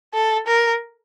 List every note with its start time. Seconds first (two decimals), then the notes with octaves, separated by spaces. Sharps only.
0.14 A4
0.47 A#4